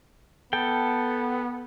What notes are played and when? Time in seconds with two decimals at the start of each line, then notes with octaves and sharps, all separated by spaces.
0.53 B3 A4 G5